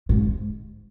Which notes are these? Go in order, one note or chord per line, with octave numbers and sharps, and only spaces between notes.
G#2